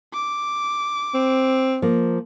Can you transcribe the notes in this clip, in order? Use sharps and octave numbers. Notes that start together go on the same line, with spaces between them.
D6
C4
F3 A#3